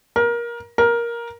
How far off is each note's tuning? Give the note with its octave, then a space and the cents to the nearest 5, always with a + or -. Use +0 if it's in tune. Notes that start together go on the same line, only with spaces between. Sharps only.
A#4 +20
A#4 +10